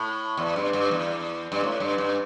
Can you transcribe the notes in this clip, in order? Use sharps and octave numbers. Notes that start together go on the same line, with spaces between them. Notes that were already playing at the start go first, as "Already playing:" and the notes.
Already playing: A2
E2
G2
G2
E2
G2
A2
G2
G2